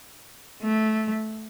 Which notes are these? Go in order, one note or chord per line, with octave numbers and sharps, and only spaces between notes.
A3